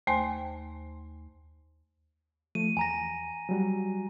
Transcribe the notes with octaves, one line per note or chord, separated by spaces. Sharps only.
D#2 A3 C5 G#5 C6
F3 A3 D#7
E2 G#5 A#5 A#6
F#3 G3 F#4